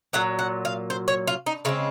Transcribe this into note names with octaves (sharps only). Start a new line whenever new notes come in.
A#2 F#3 F#5
F#5
F5
C5
C#5
F4
D#4
C#3 G#3 C4 F4